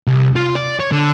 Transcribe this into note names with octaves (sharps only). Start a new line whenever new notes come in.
C2
F4
D5
C#5
D3